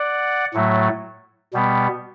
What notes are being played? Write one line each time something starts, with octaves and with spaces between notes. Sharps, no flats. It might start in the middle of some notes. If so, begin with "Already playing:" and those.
Already playing: D5 F#5
A2 F#3 A3
B2 G3 B3